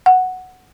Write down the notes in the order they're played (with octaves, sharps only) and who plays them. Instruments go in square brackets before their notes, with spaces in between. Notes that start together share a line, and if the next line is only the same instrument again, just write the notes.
[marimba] F#5